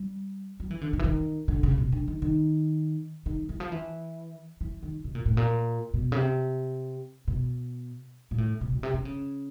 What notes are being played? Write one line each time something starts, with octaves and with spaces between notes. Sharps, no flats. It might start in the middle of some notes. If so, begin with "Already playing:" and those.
Already playing: G3
F#3
E3
D3
D#3
E3
D#3
D3
C#3
B2
D3
D#3
D#3
D#3
E3
F3
E3
E3
D#3
B2
A#2
A2
A#2
B2
C#3
C3
B2
A#2
A2
B2
B2
C3
D3
C#3